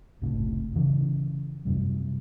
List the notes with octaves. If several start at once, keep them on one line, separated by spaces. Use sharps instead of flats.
F#1 C#2 A2 C3
C#3 E3
F#2 C3 G3